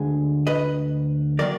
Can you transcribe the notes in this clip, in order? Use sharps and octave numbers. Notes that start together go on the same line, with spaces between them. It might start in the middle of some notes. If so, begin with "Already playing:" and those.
Already playing: D2 D3 G#3 G#4
B4 D#5
D#3 F#3 A#3 A#4 D5